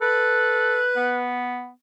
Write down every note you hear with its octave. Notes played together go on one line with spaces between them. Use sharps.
A4 B4 F#6
B3